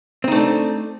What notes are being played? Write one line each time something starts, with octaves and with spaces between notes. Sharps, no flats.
A3 C4 D4 D#4